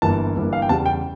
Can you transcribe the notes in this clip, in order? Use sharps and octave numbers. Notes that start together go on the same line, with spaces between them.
G1 G2 E3 A#3 A5
G1 G2 E3 A#3
F5
G5
E2 C#3 G3 A5
G5